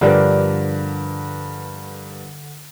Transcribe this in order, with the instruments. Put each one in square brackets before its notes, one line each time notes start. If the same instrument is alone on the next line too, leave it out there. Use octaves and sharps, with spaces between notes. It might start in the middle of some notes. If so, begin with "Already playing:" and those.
[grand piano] G2 A#4 B4 [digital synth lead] D3 [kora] F3 G3 D4